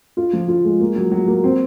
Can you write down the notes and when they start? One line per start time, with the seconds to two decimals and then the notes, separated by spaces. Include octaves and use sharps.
0.17 F4
0.33 F3
0.48 F4
0.65 G#3
0.80 A#3
0.96 F#3
1.12 F#3
1.28 A#3
1.44 C4